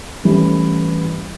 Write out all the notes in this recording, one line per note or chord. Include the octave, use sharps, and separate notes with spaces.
E3 G3 A3 C#4